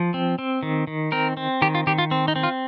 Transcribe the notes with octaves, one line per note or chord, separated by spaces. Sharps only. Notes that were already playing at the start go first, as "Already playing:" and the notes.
Already playing: F3
C4
C4
D#3
D#3
C4 A#4
C4
D#3 G4
F4
D#3 G4
F4
C4
D#4
C4
F4